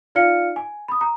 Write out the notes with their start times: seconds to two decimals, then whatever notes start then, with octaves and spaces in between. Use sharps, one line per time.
0.15 D#4 F4 D5 F5 F6 C#7
0.56 G#5
0.88 B5 D#6
1.01 A#5